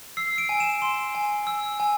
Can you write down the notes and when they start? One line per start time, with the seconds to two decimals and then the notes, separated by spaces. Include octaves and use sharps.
0.17 E6 C7
0.38 D7
0.49 G#5
0.60 E7
0.82 C6 E7
1.15 G#5
1.47 E6
1.80 G#5